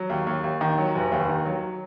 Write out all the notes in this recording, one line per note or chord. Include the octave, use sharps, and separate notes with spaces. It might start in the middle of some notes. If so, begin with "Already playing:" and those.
Already playing: F#3
D#2
D#2
D#2
D#3
F#3
F1
D#2
D#3
F#3